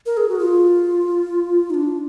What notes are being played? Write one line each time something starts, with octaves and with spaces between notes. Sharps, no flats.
A#4
G#4
F#4
F4
D#4
D4